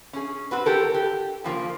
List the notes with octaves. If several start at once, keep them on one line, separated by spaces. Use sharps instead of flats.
C#4 G#4
C4 F#4 B4
G4 A4 A#4
G4
C#3 F3 A#3